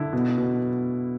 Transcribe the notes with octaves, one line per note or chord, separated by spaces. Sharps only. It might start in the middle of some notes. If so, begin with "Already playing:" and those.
Already playing: D3 E4
B2
B2